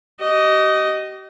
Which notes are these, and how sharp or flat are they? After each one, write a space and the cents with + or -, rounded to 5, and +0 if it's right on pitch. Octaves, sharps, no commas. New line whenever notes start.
G4 -40 D#5 +0